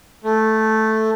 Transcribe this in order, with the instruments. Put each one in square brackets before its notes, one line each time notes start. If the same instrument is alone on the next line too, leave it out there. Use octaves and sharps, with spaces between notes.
[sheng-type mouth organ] A3